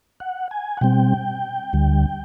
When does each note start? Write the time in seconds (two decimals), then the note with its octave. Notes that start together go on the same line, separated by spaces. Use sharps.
0.20 F#5
0.51 G#5
0.77 F#5
0.81 B2 G3 C4 G5
1.73 D2 D3 G3